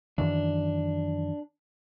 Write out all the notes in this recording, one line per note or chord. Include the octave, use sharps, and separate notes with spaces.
F#2 D#3 E3 D4